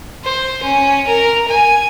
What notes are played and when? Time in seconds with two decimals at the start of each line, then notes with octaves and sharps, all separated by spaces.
0.24 C5
0.63 C#4
1.07 A#4
1.48 G#5